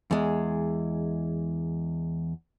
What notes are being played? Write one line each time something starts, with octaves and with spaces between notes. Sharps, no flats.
E2 G#3